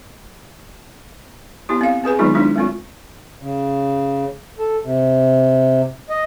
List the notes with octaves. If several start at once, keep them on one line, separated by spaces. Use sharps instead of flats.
B3 E4 G4
C4 F5
C4 G#4 B4 G#5
D#3 F#3 G#3 B3 D#4 F4
G#3 D4 E4
G#3 C4 F4
C#3
A4
C3
D#5